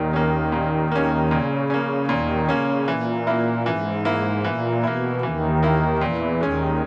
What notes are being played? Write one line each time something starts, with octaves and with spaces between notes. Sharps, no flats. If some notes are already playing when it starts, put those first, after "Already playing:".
Already playing: D#2 A#2 D#3
A#3 C#4
A#2
A#3 C#4
A#2 C#3
A#3 C#4
D#2 A#2 D#3
C#3 A#3 C#4
A#2 E3
A#3 E4
G#2 E3
A#3 E4
A#2 E3
B2 A#3 E4
D#2 D#3 E3
A#3 E4
E2 A#2 E3
D#2 D#3 G#3 C#4